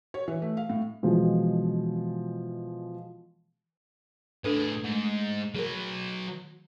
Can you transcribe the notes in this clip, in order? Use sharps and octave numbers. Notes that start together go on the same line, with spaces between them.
C#5
E3
A3
F5
A2
B2 E3 F3 G#3
A2 D4 G#4 A4 B4
G#2 A3
F#3 G#4 A#4 B4